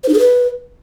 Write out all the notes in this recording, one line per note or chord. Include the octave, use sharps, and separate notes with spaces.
C5
D#4
G#4
B4